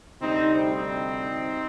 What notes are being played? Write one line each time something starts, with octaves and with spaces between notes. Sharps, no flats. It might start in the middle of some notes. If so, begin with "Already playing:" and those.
D2 C3 G3 C4 D#4
C4 D#4